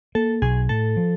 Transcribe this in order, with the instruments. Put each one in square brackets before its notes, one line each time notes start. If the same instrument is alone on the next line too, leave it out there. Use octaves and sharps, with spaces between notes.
[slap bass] A#3 [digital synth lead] A4
[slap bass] B1 [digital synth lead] G#4
[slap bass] A2 [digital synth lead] A4
[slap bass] F3